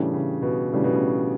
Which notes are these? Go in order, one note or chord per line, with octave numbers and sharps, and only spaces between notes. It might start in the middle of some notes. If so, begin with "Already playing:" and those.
Already playing: A2 C#3 E3 G3 D4
C#3
B2
A2 C#3 E3 G3 D4
B2
C#3